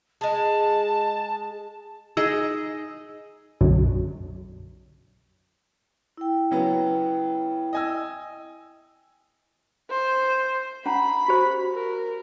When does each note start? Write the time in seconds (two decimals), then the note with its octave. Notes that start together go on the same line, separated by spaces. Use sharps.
0.21 G#3 G#4 A5
2.17 D#4 G#4 D#5 E6
3.61 B1 F#2 D3 F#3
6.17 E4 G5
6.51 C#3 F#3 B3
7.73 D#5 G#5 E6
9.90 C5
10.86 C#4 F#5 A#5 B5
11.28 F#4 G4 C5
11.73 A#4